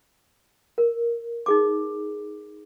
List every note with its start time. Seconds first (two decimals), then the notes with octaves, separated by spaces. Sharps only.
0.78 A#4
1.46 D#4 G#4 D6